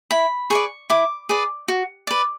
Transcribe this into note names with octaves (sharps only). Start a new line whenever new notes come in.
E4 B5
G#4 B4 D5 C#6
E4 D6
G#4 B4 D5
F#4
B4 D5